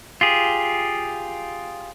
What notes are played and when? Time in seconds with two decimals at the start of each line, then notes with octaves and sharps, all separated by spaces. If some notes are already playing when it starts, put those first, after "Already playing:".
0.21 F4 G4 G#4